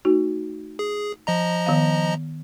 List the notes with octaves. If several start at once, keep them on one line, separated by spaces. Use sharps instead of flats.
A3 D#4 F#4
G#4
F3 D#5 A#5
D#3 B3 F5